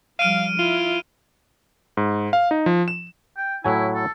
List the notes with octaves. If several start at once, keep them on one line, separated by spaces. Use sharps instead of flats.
F3 G3 F5 F6 D7 D#7
E4 F4
G#2
F5
D#4
F3
E7
G5
A2 F#3 E4 G#5
A4